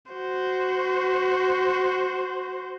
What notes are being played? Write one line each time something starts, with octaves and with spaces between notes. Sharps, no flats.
F#4 C5